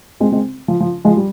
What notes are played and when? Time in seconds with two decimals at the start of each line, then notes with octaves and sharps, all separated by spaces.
0.20 G#3 C4
0.32 G#3 C4
0.68 F3
0.80 F3
1.05 F3 G#3
1.17 G3